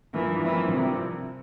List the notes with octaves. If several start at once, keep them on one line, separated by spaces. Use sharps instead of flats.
G2 E3 F3 A#3
G2 E3 F3 C4 E4 A#4
G2 C3 F3 C4 E4 A#4